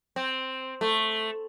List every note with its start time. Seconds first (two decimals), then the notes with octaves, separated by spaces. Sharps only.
0.16 C4
0.81 A3